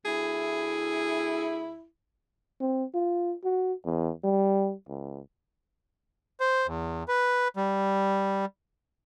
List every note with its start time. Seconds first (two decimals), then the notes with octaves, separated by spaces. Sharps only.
0.05 D2 E4 G#4
2.61 C4
2.94 F4
3.44 F#4
3.85 E2
4.24 G3
4.89 C#2
6.40 C5
6.67 E2
7.08 B4
7.57 G3